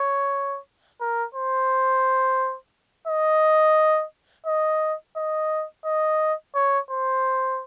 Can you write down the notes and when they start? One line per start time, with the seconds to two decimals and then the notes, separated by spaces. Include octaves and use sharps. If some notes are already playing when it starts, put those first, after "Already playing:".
Already playing: C#5
1.01 A#4
1.35 C5
3.08 D#5
4.47 D#5
5.17 D#5
5.85 D#5
6.55 C#5
6.90 C5